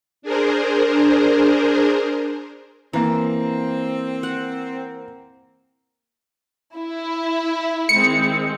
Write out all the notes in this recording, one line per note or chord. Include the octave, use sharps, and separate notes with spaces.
D4 G#4 A#4 C5
E3 A#3 C4 A#5
F#5
E4
D#3 G#3 C4 C#7